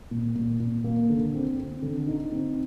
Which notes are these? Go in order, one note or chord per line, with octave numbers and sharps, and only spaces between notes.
A#2
A#2
A#2
A#3
D3
C4
C4
D3
D#4
C4